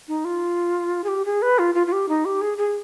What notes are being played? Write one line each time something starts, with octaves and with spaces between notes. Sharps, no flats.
D#4
F4
G#4
G4
G#4
B4
F4
F4
F4
G4
D#4
G4
G#4
G#4